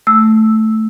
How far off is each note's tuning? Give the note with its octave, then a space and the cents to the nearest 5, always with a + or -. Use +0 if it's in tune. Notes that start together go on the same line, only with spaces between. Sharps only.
A3 +0 E6 -5